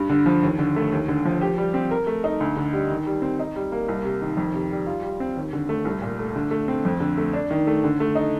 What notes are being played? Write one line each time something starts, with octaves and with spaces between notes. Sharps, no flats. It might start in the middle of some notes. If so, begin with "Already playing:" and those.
Already playing: G2
D3
F3
D#2
D3
A3
D#2
D3
F3
G4
G3
C4
A#4
A3
D#4
D2
D3
G3
D#3
G3
C4
D#4
G3
A#3
C2
C3
D#3
F2
C3
G3
F4
G3
C4
D#2
D3
A3
C2
A#2
A3
D3
A3
C4
F2
D3
A3
D4
D#3
A3
D3
A3
D#4